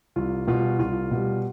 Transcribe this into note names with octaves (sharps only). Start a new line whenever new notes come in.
C2 F4
B2 G3 F4
C2 F4
B2 G3